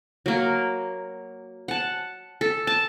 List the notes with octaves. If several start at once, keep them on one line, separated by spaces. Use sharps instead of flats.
F#3 A#3
F#5 A5
A4
A5